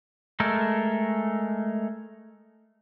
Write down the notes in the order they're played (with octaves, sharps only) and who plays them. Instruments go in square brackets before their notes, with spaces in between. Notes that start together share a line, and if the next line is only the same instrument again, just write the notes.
[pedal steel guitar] G#3 A3 A4 A#4